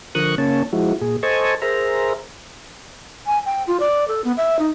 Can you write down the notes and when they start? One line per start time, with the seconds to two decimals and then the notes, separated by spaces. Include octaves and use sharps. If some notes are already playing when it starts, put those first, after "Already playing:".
0.15 D3 F3 A#4 C#6 D#6 F#6
0.38 C#3 A#3 C#4 C#5 A5
0.73 F3 G#3 E4 F#4
1.01 A#2 G#4
1.23 A4 C5 D#5 G#5 A5 C#6
1.62 G#4 A#4 C5 E5 A#5
3.26 G#5
3.46 G5
3.67 F4
3.80 D5
4.08 A4
4.24 B3
4.37 E5
4.59 D#4